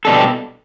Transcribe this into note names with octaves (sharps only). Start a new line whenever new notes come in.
B2 G3 D4 A4